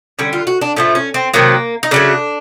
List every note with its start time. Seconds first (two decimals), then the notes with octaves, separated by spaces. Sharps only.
0.19 D3 G3 C#4
0.33 F4
0.47 F#4
0.61 D4
0.76 A2 F3 A3 C#4
0.95 C#4
1.14 C4
1.34 C3 D#3 F#3 A#3
1.83 D#4
1.91 C#3 F#3 A3 D4